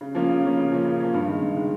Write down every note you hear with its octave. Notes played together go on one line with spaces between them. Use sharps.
C#3
F3 A#3 C#4
C#3
F3 A#3 C#4
C#3
F3 A#3 C#4
C#3
F3 A#3 C#4
G2
D#3 G#3
G2
D#3 G#3